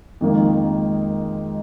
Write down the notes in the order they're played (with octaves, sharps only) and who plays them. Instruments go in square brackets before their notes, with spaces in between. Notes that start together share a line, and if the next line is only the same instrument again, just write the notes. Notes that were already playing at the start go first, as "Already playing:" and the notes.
[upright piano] F2 D#3 A#3 [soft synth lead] G#3